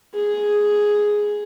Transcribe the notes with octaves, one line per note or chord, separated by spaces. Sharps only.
G#4